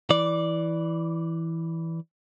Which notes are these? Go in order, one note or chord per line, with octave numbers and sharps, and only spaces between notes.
E3 D5